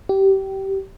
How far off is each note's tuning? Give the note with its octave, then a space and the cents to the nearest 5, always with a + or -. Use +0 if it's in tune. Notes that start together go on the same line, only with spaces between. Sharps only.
G4 -20